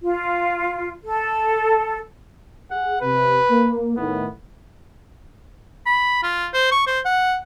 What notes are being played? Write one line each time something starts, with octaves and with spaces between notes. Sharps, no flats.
F4
A4
G#4 F#5
C3 B4
A#3
A2 D#3 B3
B5
F4
C5
C#6
C5
F#5